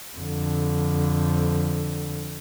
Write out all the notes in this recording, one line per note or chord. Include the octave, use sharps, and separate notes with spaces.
F2 D3